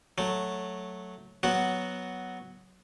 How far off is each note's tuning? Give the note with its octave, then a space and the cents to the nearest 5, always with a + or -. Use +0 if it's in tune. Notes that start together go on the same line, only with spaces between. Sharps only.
F#3 +0 A3 +0
F#3 +5 B3 +0 F#4 +0